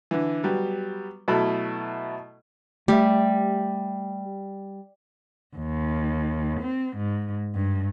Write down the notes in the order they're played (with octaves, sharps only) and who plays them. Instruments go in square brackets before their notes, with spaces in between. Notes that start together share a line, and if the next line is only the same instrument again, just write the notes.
[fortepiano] D3 E3
F#3 G3 B3
B2 F#3 A3 E4 A4 B5
[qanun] G3 [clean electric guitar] A3 G4 E5
[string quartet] D#2
C4
G#2
G2